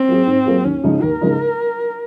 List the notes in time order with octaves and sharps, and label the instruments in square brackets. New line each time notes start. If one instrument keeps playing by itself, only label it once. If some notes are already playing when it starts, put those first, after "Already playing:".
Already playing: [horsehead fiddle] C4
[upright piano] F#3 A#3 F4 G#4
G#2
F#3 A#3 F4 G#4
[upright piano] D#2 [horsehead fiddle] C#4
[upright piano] C#3 F3 G#3 D#4
[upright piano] D#2 [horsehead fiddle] A#4
[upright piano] C#3 F3 G#3 D#4